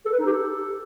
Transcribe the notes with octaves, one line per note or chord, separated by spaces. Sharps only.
A4
B4
D#4
G4
A4